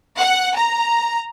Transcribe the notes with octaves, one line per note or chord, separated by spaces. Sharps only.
F#5
A#5